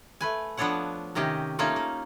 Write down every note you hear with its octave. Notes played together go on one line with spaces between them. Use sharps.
A3 B4 G#5
F3 B3 D4 A4 C#5 F#5
C3 D#3 C#4 G4 D#5
A3 A#3 C#4 D#4 F4 C#5
A#3